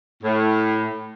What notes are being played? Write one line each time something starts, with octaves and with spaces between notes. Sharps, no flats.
A2